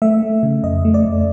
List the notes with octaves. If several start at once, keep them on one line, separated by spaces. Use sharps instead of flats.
A3 E5
A3
C#3
F2 D#5
A3
D5
F2